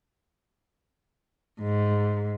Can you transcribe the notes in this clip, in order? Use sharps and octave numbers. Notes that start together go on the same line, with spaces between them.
G#2